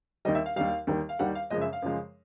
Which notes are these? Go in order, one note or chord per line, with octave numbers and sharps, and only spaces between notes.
D#2 D#3 G3 D#5
E5
F5
D#2 D#3 G3 F5
D#2 D#3 G3
F5
D#2 D#3 G3 F#5
F5
F#2 C#3 F3 G#3 D#5
E5
F5
F#2 C#3 F3 G#3